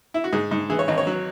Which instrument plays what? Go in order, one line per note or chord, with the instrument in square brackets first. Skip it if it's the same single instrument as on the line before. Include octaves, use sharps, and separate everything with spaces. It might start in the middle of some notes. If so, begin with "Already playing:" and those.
[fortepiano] E4
F#4
G#2 G#4
G#2
E3 G#4
C#5
G#1 D#5
C#5
F#3